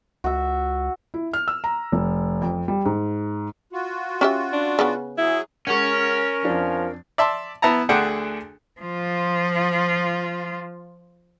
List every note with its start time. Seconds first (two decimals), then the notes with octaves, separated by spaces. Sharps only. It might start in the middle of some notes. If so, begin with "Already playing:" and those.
0.24 C#2 F#4 E5
1.14 E4
1.33 F6
1.48 E6
1.64 A#5
1.92 F1
2.42 F2
2.68 G3
2.85 G#2
3.73 F4 F#4
4.21 C#4 G4 E5
4.53 D4
4.79 C#3 B3
5.18 F#3 E4 G#4
5.67 G#3 C#4 A#4 C#5 F#5
6.45 F2 F3 D4
7.18 D5 E5 A5 C6
7.62 B3 E4 A5 A#5
7.89 D2 D3 D4 G#4 F#5 G5
8.81 F3 F4